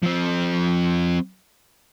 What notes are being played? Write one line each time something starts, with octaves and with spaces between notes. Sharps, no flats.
F3 C4